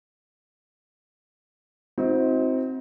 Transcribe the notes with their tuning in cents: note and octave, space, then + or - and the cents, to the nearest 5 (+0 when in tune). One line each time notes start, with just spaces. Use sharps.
C4 +0 D#4 +40 F#4 -25